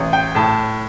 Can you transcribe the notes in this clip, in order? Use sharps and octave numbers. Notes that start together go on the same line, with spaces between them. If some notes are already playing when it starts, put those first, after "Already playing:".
Already playing: A1
G5
A2 A5